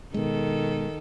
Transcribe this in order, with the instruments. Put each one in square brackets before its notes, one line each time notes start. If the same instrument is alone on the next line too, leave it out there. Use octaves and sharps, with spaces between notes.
[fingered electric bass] B2 G#3 [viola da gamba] D#3 A4